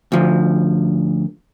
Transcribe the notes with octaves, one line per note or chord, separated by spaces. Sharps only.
D2 F3